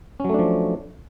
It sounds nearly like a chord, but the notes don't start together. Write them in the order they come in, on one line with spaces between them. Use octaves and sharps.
C#4 F#3 A3 D4 F3